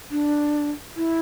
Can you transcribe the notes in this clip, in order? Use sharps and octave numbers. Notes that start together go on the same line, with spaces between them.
D4
E4